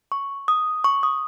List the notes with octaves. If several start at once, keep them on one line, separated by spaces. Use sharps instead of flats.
C#6
D#6
C#6
D#6